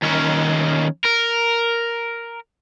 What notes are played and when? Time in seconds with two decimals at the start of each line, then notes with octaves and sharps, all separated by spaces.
0.02 D#2 C#4
1.04 A#4